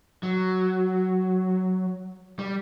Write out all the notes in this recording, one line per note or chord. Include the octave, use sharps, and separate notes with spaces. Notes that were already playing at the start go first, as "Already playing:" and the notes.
F#3
G3